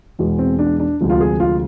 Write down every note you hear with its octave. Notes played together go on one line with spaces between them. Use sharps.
E2 B2 G#3
C4
D4
D4
D2 C3 F3 G#3
F4
G#4
F4